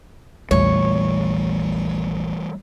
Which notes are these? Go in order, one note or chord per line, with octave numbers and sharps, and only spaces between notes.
A#1 E2 E3 G3 A3 C#5